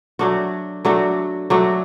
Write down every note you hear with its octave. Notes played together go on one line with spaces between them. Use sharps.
F#3 A3 D4 F#4
F#3 A3 D4 F#4
F#3 A3 D4 F#4